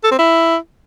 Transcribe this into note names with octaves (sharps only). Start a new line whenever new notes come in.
A4
C4
E4